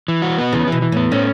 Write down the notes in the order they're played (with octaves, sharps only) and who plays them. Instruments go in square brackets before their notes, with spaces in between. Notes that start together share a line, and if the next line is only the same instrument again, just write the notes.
[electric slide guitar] E3
F#4
B3
[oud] C#3 [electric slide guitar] E3
[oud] B2 [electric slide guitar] E3
[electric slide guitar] E3
[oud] A2 [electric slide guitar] B3
[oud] A2 [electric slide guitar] C#4